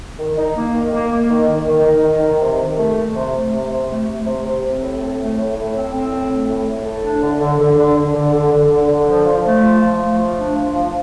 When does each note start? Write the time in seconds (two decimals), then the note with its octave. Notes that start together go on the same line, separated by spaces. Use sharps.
0.19 D#3
0.38 D#4
0.57 A#3
0.75 D#3
0.93 A#3
1.12 A#3
1.30 D#3
1.48 D#3
1.67 D#3
1.86 D#4
2.04 D#3
2.22 D#3
2.41 C3
2.60 D#3
2.78 A3
2.96 A3
3.15 C3
3.34 A3
3.53 C3
3.71 C3
3.90 A3
4.07 A3
4.26 C3
4.45 C3
4.63 C4
4.82 A2
5.00 A3
5.19 A3
5.38 A2
5.56 A2
5.74 C4
5.93 C4
6.12 A2
6.30 A3
6.49 A2
6.67 A2
6.85 A3
7.04 D4
7.22 D3
7.41 D3
7.60 D3
7.78 D3
7.96 D3
8.15 D3
8.33 D3
8.52 D3
8.71 D3
8.89 D3
9.08 F3
9.25 F3
9.45 A3
9.63 F3
9.81 F3
10.00 A3
10.18 F3
10.37 D4
10.56 F3
10.74 F3